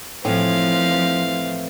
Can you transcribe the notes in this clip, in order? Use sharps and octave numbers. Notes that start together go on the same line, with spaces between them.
A2 E3 F3 C4 F5